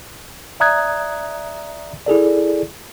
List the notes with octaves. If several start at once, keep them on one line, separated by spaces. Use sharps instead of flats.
D5 E5 A#5 D#6 F#6 G#6
E4 G#4 A4 D5